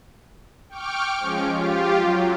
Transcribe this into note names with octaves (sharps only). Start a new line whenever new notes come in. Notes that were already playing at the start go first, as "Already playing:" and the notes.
G5 C#6 D6 F6 D7
F3 G#3 C#4
F4 G4
F#3